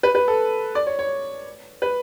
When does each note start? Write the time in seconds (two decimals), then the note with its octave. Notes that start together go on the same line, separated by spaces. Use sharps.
0.03 B4
0.15 B4
0.28 A4
0.75 D5
0.87 C#5
0.99 C#5
1.82 B4